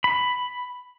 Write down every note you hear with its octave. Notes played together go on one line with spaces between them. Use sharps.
B5